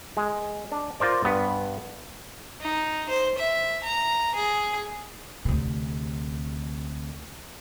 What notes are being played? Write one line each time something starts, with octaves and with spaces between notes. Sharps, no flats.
G#3
D4
F4 A#4 C5 D5
G2 B3
D#4
C5
E5
A#5
G#4
D2 C3